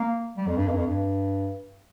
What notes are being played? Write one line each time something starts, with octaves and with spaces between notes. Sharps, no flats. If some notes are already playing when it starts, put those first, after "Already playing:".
Already playing: A#3
G3
F2
G2
F2
G2
F2
G2